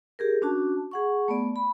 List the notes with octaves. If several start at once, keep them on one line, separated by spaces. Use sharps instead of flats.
G4 G#4 A#4
C#4 D4 F#4 A5
G#4 F#5 C#6
A3 B3 D5
B5